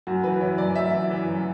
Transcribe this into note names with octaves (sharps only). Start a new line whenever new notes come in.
F#2 F#4
E3 B4
E3 C#5
F#2 D5
F#2 E5
E3
E3
F#2